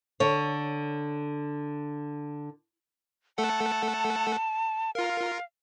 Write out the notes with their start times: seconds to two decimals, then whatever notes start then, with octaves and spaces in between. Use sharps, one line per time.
0.20 D3 C#5
3.38 A3 A4 F#5 A5
4.95 F4 A#4 F5